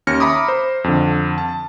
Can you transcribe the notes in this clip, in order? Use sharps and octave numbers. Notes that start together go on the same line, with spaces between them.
D#2 C#4 F6 A#6 C#7
E5 A#5 B5 D6 D#6
C5
F2 D3
A5